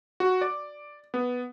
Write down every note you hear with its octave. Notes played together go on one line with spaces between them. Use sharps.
F#4
D5
B3